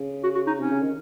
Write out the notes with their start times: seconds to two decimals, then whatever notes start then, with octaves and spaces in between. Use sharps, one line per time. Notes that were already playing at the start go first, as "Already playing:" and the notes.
Already playing: C#3
0.23 F#4
0.35 F#4
0.47 D#4
0.58 C3 C#4
0.71 C#3
0.82 D#3